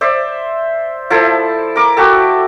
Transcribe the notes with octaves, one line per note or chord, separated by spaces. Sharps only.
C5 D5 E5
F3 E4 A4
A#4 D6
F#4 G4 A4